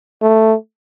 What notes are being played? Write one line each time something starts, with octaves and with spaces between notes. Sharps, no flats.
A3